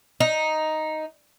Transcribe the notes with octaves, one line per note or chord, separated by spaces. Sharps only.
D#4